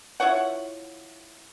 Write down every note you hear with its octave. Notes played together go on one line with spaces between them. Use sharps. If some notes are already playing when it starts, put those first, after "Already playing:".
E4 F4 C#5 F#5